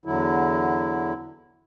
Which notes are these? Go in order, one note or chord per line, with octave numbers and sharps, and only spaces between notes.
E2 D3 F#3 E4